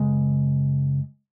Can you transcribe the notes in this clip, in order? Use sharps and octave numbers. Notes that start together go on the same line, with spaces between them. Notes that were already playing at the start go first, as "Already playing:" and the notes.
Already playing: F#2 C#3 G#3